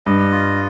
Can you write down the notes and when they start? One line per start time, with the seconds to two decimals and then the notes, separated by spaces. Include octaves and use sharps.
0.06 G2 D#5
0.32 F4